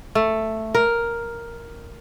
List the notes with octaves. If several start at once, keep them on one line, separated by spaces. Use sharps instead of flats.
A3
A#4